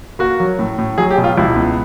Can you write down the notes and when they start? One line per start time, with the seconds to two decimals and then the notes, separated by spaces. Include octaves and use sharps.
0.19 A#3 F#4
0.40 F#3
0.59 A2
0.79 A2
0.98 F#3 G#4
1.11 G4
1.18 B2
1.24 F4
1.37 C#2 E4
1.56 B3